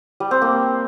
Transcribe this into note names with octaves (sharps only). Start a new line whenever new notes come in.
G3
C4
A#3